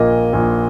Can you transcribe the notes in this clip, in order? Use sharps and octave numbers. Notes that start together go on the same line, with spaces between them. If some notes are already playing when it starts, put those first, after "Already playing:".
Already playing: A#1 A#2 A#3 D#5
A#1 A#2 A#3